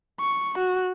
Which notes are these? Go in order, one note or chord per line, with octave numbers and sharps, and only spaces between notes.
C#6
F#4